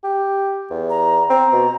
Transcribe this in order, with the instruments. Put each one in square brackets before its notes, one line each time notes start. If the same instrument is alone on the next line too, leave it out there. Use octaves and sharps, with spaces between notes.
[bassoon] G4
E2
[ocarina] A#5
[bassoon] C4 [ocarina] A#5
[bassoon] B2